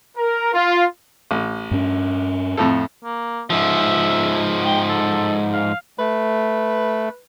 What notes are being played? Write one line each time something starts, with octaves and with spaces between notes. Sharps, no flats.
A#4
F4
A1
G2 C#4
F2 A2 A4
A#3
G#2 F3 E5
G5
A4
F5
A3 B4